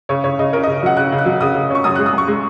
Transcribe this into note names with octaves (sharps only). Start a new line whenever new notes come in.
C#3 C#5
C#3 C#5
C#3 D#5
C#4 A#4
C#3 D#5
F#3 F#5
C#3 F#6
C#3
F#6
F#3
C#3 D#6
C#3
C#4 C#6
F#2 D#6
G#3 F#6
D#6
F#2 C#6
G#3